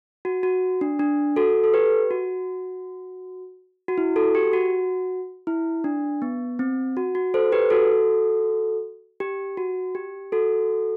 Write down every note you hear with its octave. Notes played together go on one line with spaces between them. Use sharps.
F#4
F#4
D4
D4
F#4 A4
A4
G4 B4
F#4
F#4
E4
F#4 A4
G4
F#4
E4
D4
B3
C4
F#4
F#4
A4 C5
G4 B4
F#4 A4
G4
F#4
G4
F#4 A4